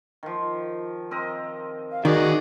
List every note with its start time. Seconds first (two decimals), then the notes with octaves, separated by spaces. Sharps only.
0.23 D#3 F3
1.11 C4 A#4 D#5
1.92 F5
2.05 D#3 F#4 G#4 D5 D#5